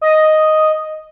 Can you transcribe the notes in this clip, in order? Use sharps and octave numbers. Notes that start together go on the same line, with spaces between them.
D#5